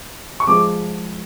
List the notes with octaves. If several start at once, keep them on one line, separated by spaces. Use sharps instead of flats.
C#6
F3 G#3 D6